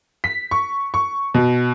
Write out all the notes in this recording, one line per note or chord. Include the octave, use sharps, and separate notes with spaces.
B6
C#6
C#6
B2